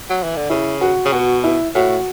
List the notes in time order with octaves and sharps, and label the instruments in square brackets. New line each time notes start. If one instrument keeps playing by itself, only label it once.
[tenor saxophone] F#3
E3
D3
[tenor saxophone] C#3 [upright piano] E4
[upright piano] F#4
[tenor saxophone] C#3
[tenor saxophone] B2 [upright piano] F#4
[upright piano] E4
[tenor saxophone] A2 [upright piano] F#4